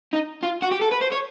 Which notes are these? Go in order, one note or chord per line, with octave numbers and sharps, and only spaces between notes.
D#4
F4
F#4
G4
A4
B4
C5
C#5